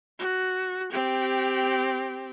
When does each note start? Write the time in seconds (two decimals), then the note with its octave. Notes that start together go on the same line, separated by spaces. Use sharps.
0.19 F#4
0.92 C4 G4